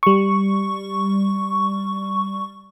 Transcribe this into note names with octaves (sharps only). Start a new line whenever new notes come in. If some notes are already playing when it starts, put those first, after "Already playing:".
G3 C#6